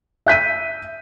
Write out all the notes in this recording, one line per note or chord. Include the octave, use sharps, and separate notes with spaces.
E5 G6 B6 D#7